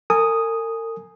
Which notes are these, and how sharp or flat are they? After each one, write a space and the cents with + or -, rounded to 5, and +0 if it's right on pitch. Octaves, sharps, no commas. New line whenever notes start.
A#4 -45 G#5 +0 D#6 +0